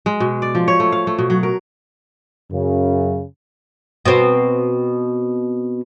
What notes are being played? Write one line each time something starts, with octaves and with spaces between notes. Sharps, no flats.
G#3
B2
D5
F3
C#5
A3
F5
A3
B2
F#3
A#4
F#2 C#3
B2 C4